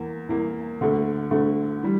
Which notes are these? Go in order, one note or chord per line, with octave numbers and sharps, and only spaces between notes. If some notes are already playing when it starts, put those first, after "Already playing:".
Already playing: E2 E3 A#3
E2 E3 A#3
D2 D3 A3
D2 D3 A3
E3 G3